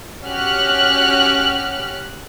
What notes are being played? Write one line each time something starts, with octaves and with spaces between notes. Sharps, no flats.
C#4 F#4 G4 F6 F#6